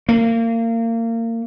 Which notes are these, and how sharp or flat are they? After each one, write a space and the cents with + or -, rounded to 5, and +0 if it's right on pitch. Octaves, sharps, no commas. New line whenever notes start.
A#3 -30